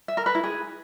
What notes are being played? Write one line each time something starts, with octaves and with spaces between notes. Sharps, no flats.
E5
A#4
B4
E4
G#4